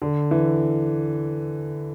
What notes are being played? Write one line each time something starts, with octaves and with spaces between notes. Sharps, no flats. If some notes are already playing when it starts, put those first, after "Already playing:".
D3
E3